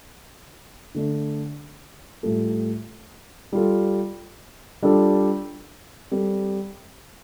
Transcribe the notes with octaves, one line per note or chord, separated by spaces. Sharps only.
D3 A3 D4
A2 G3 F4 A4
G3 F4 A4
G3 D4 F4 A4
G3 C4 A4